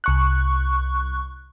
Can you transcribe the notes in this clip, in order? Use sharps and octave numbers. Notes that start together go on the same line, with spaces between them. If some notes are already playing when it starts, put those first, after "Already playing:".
C2 C#6 F#6